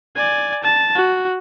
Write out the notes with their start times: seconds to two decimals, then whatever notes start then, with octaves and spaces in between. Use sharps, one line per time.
0.16 D5 G#5
0.63 A5
0.95 F#4